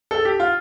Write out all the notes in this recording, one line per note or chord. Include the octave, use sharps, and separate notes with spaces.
A4
G4
F4